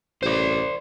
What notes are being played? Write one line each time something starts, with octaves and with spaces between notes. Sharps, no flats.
A1 C5 D5